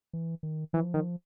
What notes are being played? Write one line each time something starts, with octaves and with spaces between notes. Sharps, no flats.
E3
D#3
E3 F3
D#3